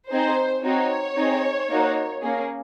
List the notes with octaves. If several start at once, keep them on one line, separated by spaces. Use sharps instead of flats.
C4 D#4 G#4 C5
C4 D#4 F#4 C#5
C4 D#4 G#4
A#3 D#4 F#4
A#3 C#4 G#4